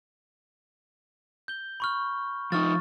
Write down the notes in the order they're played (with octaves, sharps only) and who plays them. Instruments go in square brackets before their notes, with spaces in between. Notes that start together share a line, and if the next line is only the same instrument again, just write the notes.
[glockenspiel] G6 G7
B5 C#6 F6
[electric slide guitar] F3 D#4 [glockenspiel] C#6 F6 A6